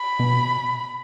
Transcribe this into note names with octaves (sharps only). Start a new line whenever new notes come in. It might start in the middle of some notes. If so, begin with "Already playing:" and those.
Already playing: B5
B2